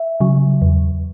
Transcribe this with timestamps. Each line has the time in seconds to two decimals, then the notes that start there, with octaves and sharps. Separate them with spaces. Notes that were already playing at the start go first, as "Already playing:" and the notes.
Already playing: E5
0.20 C#3 F#3
0.62 E2